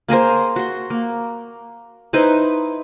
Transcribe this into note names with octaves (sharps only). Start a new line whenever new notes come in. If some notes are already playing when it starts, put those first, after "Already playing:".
A#3 G#4 A#4 C5
F#4 C6
A#3
D#4 E4 B4 C5